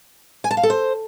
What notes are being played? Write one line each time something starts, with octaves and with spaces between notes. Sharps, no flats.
G#5
A5
F5
A4
C5